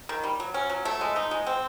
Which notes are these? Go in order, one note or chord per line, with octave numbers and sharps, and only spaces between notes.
D#3
G3
F#3
C#4
F#3
A3
G#3
D#4
G#3
C4